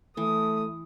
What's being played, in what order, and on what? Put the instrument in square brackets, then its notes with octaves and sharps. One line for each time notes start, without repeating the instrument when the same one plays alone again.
[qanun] E3 [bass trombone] A3 [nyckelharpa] D#6